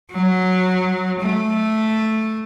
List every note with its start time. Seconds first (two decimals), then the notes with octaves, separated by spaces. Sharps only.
0.12 F#3
1.20 A3